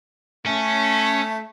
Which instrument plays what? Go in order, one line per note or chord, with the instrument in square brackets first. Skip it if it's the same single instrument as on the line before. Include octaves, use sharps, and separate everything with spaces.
[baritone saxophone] A3 [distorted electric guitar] C#4